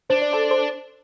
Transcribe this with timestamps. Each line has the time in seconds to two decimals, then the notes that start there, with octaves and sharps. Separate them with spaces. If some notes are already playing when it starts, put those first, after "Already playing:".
0.10 D4 C5
0.22 D5
0.33 A4 C5
0.51 A4 C5